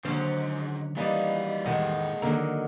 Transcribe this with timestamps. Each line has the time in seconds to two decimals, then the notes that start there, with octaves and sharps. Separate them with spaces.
0.05 D#2 G#2 D3 F#3 C#4 C5
0.97 E3 F#3 G3 A#3 B3 D#4 D5
1.66 E2 A2 D#3 G#3 G#4 D#5 F#5
2.22 D3 D#3 F#3 A#3 A#5